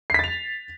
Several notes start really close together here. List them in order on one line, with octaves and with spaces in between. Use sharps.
C7 B6 A6 F7